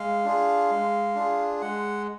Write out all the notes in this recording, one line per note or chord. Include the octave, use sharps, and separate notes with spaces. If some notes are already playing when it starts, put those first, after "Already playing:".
Already playing: G#3 F5
D4 F4 G#4
G#3
D4 F4 G#4
G#3 F#5